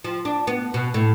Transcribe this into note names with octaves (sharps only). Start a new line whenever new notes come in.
F3
D4
B3
B2
A2